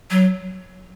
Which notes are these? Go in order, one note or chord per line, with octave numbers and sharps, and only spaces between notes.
F#3